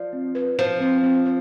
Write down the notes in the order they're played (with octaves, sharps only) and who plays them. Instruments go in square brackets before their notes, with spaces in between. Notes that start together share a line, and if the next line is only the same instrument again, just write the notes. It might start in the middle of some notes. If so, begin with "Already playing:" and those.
Already playing: [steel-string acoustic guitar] F3 [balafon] D5
[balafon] C4
B4
[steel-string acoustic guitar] F3 [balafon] C5
[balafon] C4
C4
C5